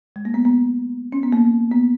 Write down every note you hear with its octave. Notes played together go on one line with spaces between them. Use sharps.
G#3
A#3
B3
B3
C#4
B3
A#3
B3